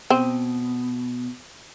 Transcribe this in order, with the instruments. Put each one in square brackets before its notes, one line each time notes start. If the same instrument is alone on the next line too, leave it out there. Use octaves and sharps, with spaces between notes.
[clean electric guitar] B2 [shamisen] C4